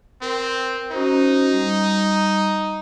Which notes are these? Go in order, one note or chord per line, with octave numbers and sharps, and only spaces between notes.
C4 A#4
C#4 D#4 F#4 C5
G3